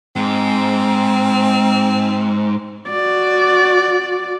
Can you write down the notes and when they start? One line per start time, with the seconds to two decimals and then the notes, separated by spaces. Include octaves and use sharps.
0.16 G#2 C4
2.89 F#4 D5